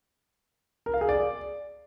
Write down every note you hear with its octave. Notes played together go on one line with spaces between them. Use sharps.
A#4
F5
G#4
D5